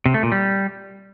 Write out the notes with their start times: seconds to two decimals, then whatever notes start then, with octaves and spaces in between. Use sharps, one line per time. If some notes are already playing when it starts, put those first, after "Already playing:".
0.06 C3
0.14 A3
0.23 A#2
0.32 G3